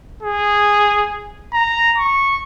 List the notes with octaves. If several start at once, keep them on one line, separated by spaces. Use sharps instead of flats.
G#4
A#5
C#6